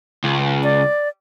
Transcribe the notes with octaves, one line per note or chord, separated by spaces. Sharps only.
C#2
D5